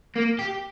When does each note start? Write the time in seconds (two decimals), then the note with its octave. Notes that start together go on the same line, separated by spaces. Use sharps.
0.16 A#3
0.39 G4